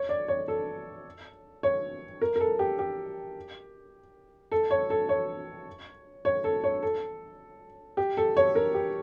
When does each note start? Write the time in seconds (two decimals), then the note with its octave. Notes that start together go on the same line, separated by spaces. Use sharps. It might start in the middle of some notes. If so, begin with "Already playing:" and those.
Already playing: C#5
0.09 D5
0.28 C#5
0.48 A4
1.63 C#5
2.21 A#4
2.36 A#4
2.40 A4
2.59 G4
2.79 G4
4.52 A4
4.71 C#5
4.90 A4
5.09 C#5
6.25 C#5
6.44 A4
6.64 C#5
6.83 A4
7.97 G4
8.17 A4
8.37 C#5
8.55 A#4
8.74 G4